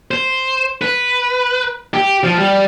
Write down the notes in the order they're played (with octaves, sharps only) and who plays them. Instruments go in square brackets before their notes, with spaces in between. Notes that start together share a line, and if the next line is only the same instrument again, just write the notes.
[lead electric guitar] C5
B4
G4
F3
G3